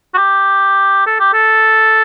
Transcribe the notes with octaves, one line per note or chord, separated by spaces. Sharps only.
F#4
G4
A4
G4
A4